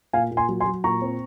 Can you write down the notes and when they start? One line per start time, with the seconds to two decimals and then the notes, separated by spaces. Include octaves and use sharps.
0.13 A#2 F5 G#5
0.31 A#2
0.37 G#5 C6
0.49 F#3
0.60 G#5 C6
0.66 F#3
0.84 A#2 A#5 C#6
1.02 C4